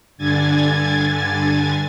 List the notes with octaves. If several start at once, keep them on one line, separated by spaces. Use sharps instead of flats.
G2 D3 G#5 G#6 A6